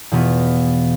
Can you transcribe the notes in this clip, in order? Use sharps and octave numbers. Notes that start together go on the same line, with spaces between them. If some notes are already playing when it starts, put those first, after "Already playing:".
E2 B2 B3 F4